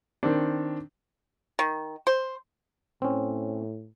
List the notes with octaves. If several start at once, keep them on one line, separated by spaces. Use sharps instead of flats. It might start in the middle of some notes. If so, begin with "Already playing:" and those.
D#3 C4 D4
D#3
C5
A2 C4 C#4